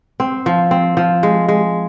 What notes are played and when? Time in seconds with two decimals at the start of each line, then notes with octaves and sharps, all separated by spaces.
0.20 C4
0.46 F3
0.71 C4
0.97 F3
1.23 G#3
1.48 G#3